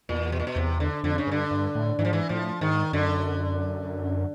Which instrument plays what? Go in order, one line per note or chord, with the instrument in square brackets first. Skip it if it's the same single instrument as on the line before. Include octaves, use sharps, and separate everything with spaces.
[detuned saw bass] E2 [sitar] A#2
[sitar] B2
A#2
B2
[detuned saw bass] E2 [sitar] C3
[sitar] D3
[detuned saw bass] F2 [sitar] D3
[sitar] C#3
[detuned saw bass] G2 [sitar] D3
[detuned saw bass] G2
A2
[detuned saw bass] G#2 [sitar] E3
[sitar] F3
E3
[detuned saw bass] A2 [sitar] F3
[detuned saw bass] G#2 [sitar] D#3
[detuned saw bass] F#2 [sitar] D3